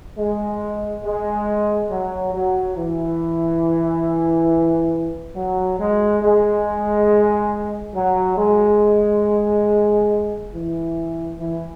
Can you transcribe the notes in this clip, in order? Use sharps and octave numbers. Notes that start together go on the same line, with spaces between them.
G#3
G#3
F#3
F#3
E3
F#3
G#3
G#3
F#3
G#3
E3
E3